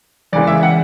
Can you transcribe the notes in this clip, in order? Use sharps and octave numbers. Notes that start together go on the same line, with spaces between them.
E2 C#3 E3 G#3 D5
E5
F#5